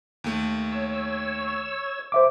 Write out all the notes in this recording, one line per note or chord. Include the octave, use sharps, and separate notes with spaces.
D#2 A3
C#5 E6
C5 E5 D6